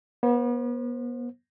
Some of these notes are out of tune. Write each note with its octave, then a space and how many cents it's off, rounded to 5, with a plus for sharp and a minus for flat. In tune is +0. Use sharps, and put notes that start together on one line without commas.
B3 -35 C5 +20